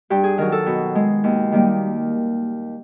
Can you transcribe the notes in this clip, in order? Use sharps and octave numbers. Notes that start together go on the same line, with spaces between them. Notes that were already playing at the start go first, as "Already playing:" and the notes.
G2 G4
G#4
D#3 F#3 A#4
A4
B2
G#3
D#2
D#3 G3 A#3